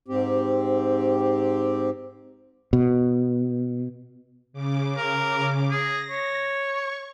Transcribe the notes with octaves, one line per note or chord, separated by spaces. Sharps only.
G#2 C4 G4
B2
C#3 D6
A#4
G#4 A#6
C#5
C#6